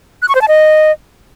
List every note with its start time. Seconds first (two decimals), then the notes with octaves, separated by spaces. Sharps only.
0.22 F#6
0.29 C#6
0.35 C5
0.42 A5
0.48 D#5